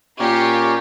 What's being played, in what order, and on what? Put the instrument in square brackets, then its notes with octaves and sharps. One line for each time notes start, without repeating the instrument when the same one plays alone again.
[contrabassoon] A#2 [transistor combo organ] C#4 A#4 D5 [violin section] F4 G4 [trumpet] C#6